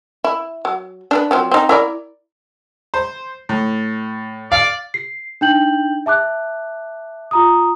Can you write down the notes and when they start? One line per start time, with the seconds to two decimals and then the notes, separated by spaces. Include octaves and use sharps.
0.24 E4
0.65 F#3
1.11 D4 A#4 B4
1.31 F3 F#3 C4
1.51 C4 D#4
1.69 E4 A#4 D5
2.94 C5
3.49 A2
4.52 D5 F5
4.94 C7
5.41 D4 D#4 G5 G6 F#7
6.06 E5 A5 D6 F#6
7.31 F4 A#5 D#6